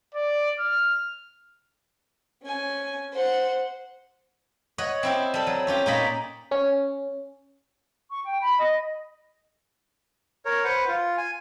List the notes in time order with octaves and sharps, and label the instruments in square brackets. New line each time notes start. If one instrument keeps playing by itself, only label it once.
[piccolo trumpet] D5
F6
[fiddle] C#4 G#5
C5 F#5
[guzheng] C#5 D#5 F#5
C4 E4 G4
G3 A4
F#3
C#4 F4 G4
A#2 D#4 F4 C#5 D#5 B5
[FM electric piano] C#4
[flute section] C#6
G5
B5
D#5
[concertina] A#4 C#5
B4 C5 F#5
F4
G#5